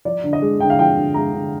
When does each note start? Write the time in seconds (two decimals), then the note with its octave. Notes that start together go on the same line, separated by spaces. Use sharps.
0.05 F3 D5
0.24 D3
0.33 D#5
0.42 G#3
0.60 D3 G5
0.70 F5
0.78 F3 G5
0.97 D3
1.14 G#3 A#5
1.33 D3